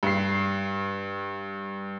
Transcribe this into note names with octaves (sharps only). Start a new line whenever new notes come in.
G2 C7